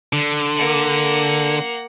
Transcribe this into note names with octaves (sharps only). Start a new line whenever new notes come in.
D3
A#3 F#5